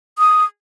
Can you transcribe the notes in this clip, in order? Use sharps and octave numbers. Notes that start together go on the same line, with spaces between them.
D#6